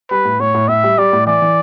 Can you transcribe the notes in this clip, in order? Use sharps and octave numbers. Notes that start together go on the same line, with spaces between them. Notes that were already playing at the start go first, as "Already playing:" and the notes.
G3 B4
A2
A2 C#5
A2
A2 E5
G3
G3 D5
A2
E3 D5
E3